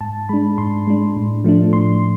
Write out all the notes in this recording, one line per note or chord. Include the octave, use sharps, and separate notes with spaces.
G#2 A5
G#3 D4 B5
G#2 C6
G#3 D4
A2
F3 A3 D4
A2 C6